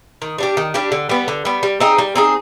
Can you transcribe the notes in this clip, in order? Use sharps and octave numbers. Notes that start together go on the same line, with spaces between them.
D#3
G3 D4 G4
D#3
G3 D4 G4
D3
G3 B3
D3
G3 B3
G3
C4 D#4 G#4
G3
C4 D#4 G#4